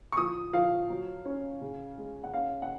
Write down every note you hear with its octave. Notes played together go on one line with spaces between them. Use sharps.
C#6
F3 D#6
F3 F5
F#3
C#4
C#3
G#3
F#5
C#4 F5
F#5